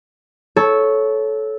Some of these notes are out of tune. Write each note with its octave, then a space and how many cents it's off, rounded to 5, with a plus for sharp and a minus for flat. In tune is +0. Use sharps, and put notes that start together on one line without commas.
A4 -15 C#5 +0